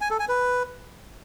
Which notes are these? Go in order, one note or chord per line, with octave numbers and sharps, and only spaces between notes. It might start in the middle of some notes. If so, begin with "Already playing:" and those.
G#5
A4
G#5
B4